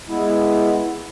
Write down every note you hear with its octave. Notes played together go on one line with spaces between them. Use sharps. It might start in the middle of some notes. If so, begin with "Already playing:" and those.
G#3 B3 E4